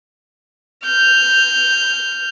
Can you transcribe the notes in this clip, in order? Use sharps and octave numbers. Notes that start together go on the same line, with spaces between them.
F6 G6